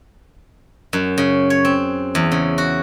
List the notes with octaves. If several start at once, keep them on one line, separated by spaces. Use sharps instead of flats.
F#2
C#3
C#5
C4
E2
C#3
F#4